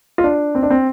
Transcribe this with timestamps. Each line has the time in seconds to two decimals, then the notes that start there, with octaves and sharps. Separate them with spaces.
0.18 F4
0.24 D4
0.55 C4
0.63 D4
0.71 C4